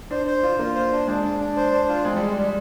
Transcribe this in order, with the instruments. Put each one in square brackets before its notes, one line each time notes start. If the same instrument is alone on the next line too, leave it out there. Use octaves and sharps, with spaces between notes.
[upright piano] D4 [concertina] C5
[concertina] C5
[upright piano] D4 [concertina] F4
[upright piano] A#3 [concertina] F4
[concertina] C5
D4
[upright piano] G#3 [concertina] D4
[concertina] D4
D4
C5
D4
F4
[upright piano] G#3 [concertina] C4
[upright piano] G3 [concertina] G#3
[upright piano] G3 [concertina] G#3